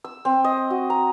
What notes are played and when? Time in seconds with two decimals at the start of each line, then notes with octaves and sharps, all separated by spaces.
0.04 E6
0.25 C4
0.44 D#5
0.70 F#4
0.90 A#5